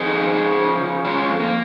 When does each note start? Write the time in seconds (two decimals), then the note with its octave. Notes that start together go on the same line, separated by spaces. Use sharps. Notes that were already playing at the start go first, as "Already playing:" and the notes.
Already playing: F2 D#4 G#4
0.12 C#3
0.35 C#3
0.58 F3
0.82 C#3
1.05 G#3 C#4 F4
1.28 F2
1.40 A#3